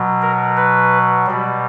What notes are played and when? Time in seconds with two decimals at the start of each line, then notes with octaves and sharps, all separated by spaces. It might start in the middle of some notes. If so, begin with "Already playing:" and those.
Already playing: B2 F#3
0.22 A#4
0.57 B4
1.27 B2 G3